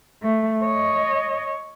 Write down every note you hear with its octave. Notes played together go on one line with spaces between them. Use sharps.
A3
C#5 D#5